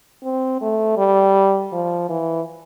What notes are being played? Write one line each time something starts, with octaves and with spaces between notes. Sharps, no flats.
C4
A3
G3
F3
E3